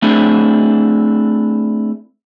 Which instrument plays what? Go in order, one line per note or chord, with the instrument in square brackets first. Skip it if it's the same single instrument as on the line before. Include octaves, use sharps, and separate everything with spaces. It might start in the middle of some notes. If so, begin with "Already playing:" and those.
[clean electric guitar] A3 C4 D4 E4 G#4